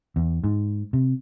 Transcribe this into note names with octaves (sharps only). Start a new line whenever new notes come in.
E2
G#2
C3